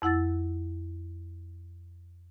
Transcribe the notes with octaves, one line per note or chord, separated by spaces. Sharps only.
F2 E4 F#5 E6 A6